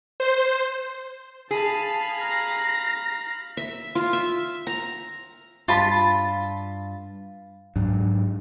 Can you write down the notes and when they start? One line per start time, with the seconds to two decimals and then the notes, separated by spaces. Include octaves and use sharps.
0.20 C5
1.51 G#4 F5 A5 B5
2.21 A#5 F6 A#6
3.57 E5
3.95 F4
4.13 E5
4.67 A#5
5.68 G2 F4 A5 B5
7.76 G#2 F#3 D4